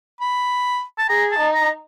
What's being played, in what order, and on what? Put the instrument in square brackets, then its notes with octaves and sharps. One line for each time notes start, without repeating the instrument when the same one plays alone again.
[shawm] B5
A5
[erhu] G#4 [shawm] A#5
[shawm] A5
[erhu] D#4
[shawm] A#5